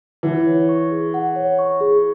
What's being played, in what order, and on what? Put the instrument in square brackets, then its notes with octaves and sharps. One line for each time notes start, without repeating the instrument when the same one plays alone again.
[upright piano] E3 [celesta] F#5
[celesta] C#5
C#6
G#4
F#5
C#5
C#6
G#4